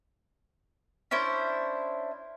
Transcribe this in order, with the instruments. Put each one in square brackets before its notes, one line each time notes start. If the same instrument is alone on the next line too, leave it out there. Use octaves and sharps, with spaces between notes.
[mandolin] C#4 D4 E4 C5